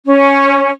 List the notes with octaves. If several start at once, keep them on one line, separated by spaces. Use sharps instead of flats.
C#4